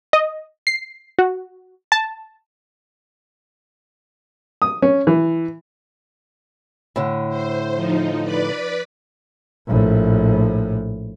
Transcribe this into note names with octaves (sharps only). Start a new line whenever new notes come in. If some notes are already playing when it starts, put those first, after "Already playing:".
D#5
C7
F#4
A5
D#6
C#4
E3
A2 D3
C5
F3 D#4
B4 D5 B5
A#1 A2